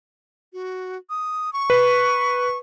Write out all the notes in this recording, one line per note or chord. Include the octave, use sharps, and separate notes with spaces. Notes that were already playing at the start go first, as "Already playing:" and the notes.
F#4
D#6
C#6
B4